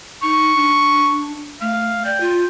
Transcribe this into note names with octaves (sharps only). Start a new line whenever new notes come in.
D#4 C#6
D4
A3 F5
D5 G5
F4